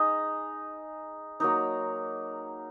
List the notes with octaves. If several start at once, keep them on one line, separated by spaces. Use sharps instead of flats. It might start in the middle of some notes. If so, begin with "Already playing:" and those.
Already playing: D#4 G#4 D#5
F#3 A#3 D#4